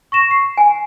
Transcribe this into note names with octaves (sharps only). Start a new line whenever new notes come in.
C#6 A#6 E7
C7
G#5